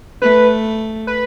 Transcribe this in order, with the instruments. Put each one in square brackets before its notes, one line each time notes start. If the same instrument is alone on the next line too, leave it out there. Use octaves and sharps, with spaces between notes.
[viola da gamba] A3 [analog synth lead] B4
[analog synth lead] B4